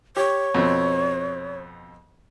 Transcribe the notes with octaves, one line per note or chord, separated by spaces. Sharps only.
G4 C#5
F2 B2 C4